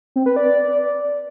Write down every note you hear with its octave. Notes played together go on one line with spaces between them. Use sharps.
C4
B4
D5